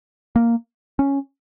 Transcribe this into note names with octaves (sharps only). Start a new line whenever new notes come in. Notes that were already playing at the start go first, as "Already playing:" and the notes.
A#3
C#4